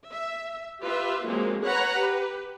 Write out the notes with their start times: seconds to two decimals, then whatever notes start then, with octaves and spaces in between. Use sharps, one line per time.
0.10 E5
0.83 F4 G4 B4 E5
1.26 F3 F#3 G#3 A#3 C4
1.64 B4 C#5 F#5 A#5 B5
1.96 G4 B4